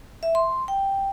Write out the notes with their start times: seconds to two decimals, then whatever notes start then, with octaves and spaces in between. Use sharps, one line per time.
0.23 E5
0.35 C6
0.68 G5